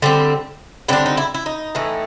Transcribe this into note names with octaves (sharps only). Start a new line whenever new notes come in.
D3 G3 C4
D3 G3 C4 D4
D#4
E4
E4
D#4
A2 E3 A3